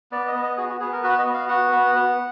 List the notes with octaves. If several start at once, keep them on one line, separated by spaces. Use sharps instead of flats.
B3 D5
D#5
B3
D#5
F#4 G#4
F#4
B3 G#4
A#4
F#4 B4
D#5
B3
F5
F#4 F#5
B3
B3